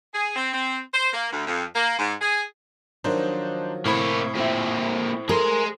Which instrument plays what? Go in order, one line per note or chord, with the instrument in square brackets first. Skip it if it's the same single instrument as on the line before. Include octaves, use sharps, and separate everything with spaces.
[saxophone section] G#4
C4
C4
C5
A#3
D2
F2
A#3
G#2
G#4
[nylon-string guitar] D#3 F3 F#3 [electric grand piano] D4 D#4 C5
[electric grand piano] A2 E4 B5 [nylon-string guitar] C3 [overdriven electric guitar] A#3 C#5
[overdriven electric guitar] A#2 C4 [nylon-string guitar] C5 E5
[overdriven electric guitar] G#4 C6 [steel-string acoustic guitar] A#4